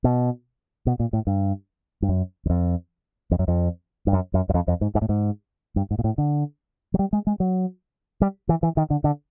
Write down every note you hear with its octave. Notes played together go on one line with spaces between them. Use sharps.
B2
B2
A#2
A2
G2
G2
F#2
E2
F2
F2
F#2
F2
G2
F#2
F#2
F#2
F2
F2
G#2
G#2
A2
G#2
G2
G#2
A#2
A2
D3
F#3
G3
G#3
G#3
F#3
G3
E3
E3
D#3
D3
D3